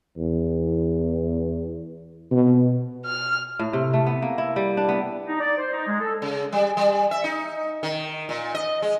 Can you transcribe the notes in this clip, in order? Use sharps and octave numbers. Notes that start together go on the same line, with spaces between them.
E2
B2
F6
A2
C3
A3
B3
A#3
E4
G3
D4
B3
D#4
D5
C5
D#4
G#3
A4
C#3
G3
G3
E5
D#4
D#3
A#2
D#5
G#3